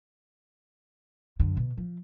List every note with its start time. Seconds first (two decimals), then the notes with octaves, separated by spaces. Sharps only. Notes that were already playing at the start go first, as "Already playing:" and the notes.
1.39 F#2 D3
1.57 B2
1.77 F3